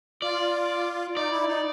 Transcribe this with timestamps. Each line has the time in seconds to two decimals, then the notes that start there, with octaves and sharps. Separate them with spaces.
0.22 F4 D5
1.16 D#4 D5
1.31 E4
1.48 D#4